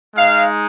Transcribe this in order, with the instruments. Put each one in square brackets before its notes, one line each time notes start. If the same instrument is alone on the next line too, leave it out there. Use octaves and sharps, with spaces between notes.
[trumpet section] G#3 D#4 F5